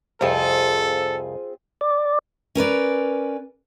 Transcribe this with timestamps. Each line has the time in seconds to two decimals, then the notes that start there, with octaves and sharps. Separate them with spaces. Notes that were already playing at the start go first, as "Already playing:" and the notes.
0.21 C2 F2 C4 F4 G#4 A4
1.81 D5
2.55 C#4 A#4 B4 D5